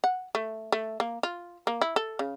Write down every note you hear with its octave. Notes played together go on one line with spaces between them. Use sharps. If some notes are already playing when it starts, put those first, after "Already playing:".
F#5
A3
A3
A#3
F4
A#3
E4
A4
C#3